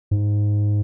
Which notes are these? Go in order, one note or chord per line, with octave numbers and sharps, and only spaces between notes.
G#2